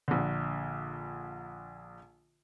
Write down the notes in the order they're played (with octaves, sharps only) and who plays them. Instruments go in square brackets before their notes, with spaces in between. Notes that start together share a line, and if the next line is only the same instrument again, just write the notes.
[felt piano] A#1 D3